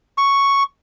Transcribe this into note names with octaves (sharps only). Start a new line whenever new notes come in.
C#6